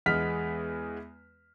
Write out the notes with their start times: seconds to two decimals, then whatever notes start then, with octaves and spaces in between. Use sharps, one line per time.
0.06 E2 G#3 B3 F6 B6